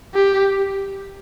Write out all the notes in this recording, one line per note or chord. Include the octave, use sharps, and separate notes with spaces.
G4